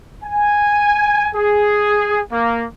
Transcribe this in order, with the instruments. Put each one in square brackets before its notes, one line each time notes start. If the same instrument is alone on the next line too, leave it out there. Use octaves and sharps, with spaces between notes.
[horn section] G#5
G#4
A#3